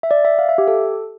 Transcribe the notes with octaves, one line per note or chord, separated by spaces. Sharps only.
E5
D5
E5
F5
E5
G4
A4